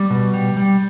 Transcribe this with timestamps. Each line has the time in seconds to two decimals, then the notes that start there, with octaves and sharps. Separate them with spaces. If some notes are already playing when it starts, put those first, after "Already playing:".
Already playing: G3
0.10 B2
0.34 G3
0.57 G3